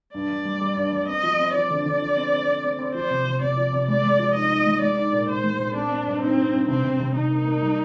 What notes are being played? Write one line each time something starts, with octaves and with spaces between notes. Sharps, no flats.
G2 D5
G3
G3
G3
G2
G3
C4 D#5
F3
C4
F3 D5
D3
D3
F3
C4
C4
C4
C4
C4
F3 C5
C3
C3
C3 D5
F3
C3
G#3 D5
G#3
F3
D#4 D#5
D#4
G#3
G#3 D5
D#4
A#2
A#2 C5
G#3
A#2
C4 D4
C4
G2
C4 D#4
G2
G2
C3 C4
C3
C3
C3 D#4
A#3
A#3
G3